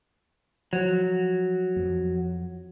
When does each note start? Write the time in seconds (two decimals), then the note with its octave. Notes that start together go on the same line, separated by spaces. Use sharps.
0.73 F3 F#3
1.76 F2 F3